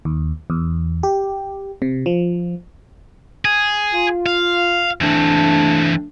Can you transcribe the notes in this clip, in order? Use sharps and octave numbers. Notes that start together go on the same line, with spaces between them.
D#2
E2
G4
C3
F3
G#4
F4
F5
E3 A3 C4 D4